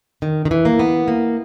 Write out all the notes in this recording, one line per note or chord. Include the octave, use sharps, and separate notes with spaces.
D#3
D#3
E3
A#3
B3
A#3